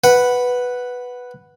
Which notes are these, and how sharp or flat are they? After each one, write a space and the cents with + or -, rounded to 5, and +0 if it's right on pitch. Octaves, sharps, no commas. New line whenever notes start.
B4 +0 F#5 +0